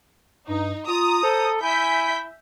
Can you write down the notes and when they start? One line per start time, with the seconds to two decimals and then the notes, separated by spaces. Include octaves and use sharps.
0.48 G2 D#4
0.87 F4 A#5 D#6
1.23 A4 C5
1.62 E4 E5 G#5 G6 B6